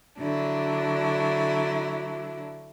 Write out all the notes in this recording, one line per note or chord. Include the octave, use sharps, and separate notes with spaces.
D3 F#3 D4 E4